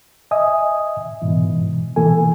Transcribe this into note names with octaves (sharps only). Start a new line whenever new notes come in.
D#5 E5 G#5 D#6
G#2 B2 E3
B2 E3 A#3 A4 G#5